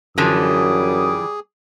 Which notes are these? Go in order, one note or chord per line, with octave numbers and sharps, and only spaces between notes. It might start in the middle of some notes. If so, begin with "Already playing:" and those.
F#2 D3 E3 F3 G3 G#4 D6 D#6